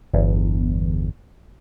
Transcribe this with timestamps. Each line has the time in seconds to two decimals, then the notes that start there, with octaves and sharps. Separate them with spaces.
0.14 G1 E2